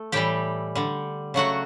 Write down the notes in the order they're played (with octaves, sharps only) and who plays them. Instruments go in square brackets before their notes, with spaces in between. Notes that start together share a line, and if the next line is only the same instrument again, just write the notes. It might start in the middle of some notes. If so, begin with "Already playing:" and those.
Already playing: [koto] A3
A2 E3 G3 G4 G5
D3 G3
C#3 F#3 A3 F#4 F#5